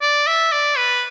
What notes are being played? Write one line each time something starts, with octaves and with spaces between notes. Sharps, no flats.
D5
E5
D5
B4